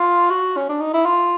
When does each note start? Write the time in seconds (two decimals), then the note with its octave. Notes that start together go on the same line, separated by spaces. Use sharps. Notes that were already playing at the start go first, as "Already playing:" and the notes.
Already playing: F4
0.30 F#4
0.57 C#4
0.69 D4
0.80 D#4
0.94 E4
1.06 F4